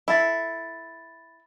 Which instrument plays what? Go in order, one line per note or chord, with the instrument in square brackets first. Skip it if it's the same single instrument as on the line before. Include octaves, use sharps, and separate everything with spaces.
[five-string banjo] E4 A4 [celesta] B5 A6